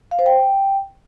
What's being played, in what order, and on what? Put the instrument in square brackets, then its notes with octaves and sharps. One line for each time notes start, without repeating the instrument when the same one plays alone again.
[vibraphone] F5
C5
G5